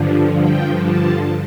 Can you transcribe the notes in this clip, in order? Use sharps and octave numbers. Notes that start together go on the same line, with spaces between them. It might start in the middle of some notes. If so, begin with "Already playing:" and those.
Already playing: G2 D3 F3
G5
A5